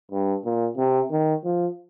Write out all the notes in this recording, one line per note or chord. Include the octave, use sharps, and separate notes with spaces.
G2
A#2
C3
D#3
F3